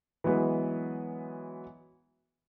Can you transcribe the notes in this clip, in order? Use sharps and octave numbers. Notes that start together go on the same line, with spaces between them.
E3 F#3 G#3 B3